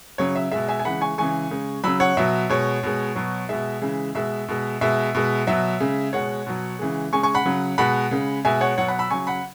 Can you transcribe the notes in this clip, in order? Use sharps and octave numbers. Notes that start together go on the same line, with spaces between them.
C#3 F#3 C#5
E5
B2 G#3 E5
E5 G#5
G#5
C#3 E3 G#3 F#5 B5
G#5 C#6
C#3 E3 G#3 G#5 C#6
C#3 G#3
C#3 F#3 B5 E6
C#5 F#5
B2 F#3 E5
B2 G#3 C#5
B2 G#3
B2 F#3
B2 G#3 E5
C#3 E3 G#3
B2 G#3 E5
B2 G#3
B2 G#3 E5
B2 G#3
B2 F#3 E5
C#3 G#3
B2 G#3 C#5 F#5
B2 F#3
C#3 E3 G#3
C#3 G#3 G#5 C#6
G#5 C#6
F#5 B5
C#3 F#3
B2 G#3 F#5 B5
C#3 G#3
B2 G#3 E5 G#5
C#5 F#5
B2 F#3 C#5 F#5
F#5 B5
B5 E6
C#3 F#3 G#5 C#6
F#5 B5